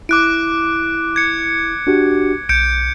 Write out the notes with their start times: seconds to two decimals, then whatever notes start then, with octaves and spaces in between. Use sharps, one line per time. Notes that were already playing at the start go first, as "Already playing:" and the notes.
0.09 E4 D6 F#6 D7
1.16 G#6 C#7
1.87 D4 F#4 G4
2.49 B1 G6 C#7 D7